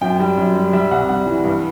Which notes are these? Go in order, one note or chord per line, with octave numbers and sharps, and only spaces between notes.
F#2 G5
G3
F#2
G3
G3 E5
C2 F#5
G3 F#5
E3
G2